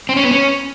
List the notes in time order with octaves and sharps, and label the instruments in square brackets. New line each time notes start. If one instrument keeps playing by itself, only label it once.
[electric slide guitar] C4
C#4
B3
C#4